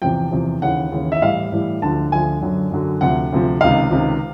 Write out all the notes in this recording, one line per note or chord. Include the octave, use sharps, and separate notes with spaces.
E2 C3 F3 G5
E2 C3 F3
D#2 C#3 E3 F#5
D#2 C#3 E3
E5
A2 E3 G3 F5
A2 E3 G3
D2 D3 F3 A5
D2 D3 F3 G#5
F#2 D3 F#3
F#2 D3 F#3
D2 C3 F3 F#5
D2 C3 F3
C#2 C3 D#3 F5
C#2 C3 D#3